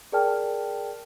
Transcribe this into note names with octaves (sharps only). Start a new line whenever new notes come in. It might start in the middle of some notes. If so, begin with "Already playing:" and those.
G#4 A#4 D5 G5 A5 F6